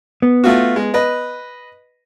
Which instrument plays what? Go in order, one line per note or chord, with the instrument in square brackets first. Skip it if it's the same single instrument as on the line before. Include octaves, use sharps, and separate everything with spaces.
[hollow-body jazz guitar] B3
[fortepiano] A3 F4 F#4
G#3
B4 D#5